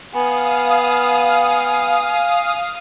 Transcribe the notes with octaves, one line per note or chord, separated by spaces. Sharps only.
B3 F5 G#5 D#6